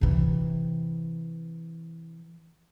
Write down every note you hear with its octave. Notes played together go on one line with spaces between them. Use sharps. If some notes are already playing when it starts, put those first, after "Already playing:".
C3 E3